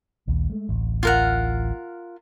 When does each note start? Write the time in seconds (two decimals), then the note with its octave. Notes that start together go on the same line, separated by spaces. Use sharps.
0.27 A#1 D#2
0.50 G#3 A3
0.69 D1 A1
1.03 F4 A#4 F#5